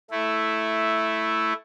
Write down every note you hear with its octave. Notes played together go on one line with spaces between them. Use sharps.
A3 E4